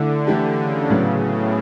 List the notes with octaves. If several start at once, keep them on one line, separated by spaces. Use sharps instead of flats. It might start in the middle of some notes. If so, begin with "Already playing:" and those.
Already playing: D3 A3 E4 A4
E3 A3 E4 G4
C#3
A2 F#3 B3
A2